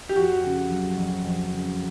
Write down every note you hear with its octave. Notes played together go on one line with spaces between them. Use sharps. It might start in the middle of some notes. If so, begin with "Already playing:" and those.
G4
F2 F#4
C#3
F#3
F2
F2
C#3